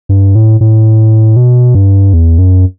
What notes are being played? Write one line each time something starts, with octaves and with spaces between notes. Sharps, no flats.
G2
A2
A2
B2
G2
E2
F#2